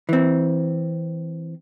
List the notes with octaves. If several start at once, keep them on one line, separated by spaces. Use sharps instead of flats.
E3 C4